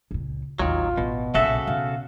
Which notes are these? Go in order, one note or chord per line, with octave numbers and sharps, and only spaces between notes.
C#2 A#2
A1 D#2 D#3 F#3 F4
A1 B2
B1 A#2 C#3 F#4 A4 E5
B2 D#3 F5